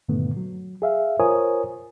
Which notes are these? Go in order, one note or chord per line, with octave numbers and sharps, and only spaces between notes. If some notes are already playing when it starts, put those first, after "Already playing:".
G2 A#2 D3 D#3 A3 B3
F#3
G#4 E5 F5
F4 A#4 C5 C#5 G#5 D#6